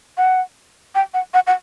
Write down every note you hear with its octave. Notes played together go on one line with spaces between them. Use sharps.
F#5
G5
F#5
F#5
F#5